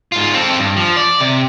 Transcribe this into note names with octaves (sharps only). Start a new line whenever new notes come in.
G#2 F4
C4 A4
G2
F3
D5
C3